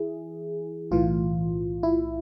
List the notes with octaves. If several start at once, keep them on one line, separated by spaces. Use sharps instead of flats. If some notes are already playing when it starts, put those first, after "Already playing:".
Already playing: E3 E4 G#4
B1 A2 E3 F4
E4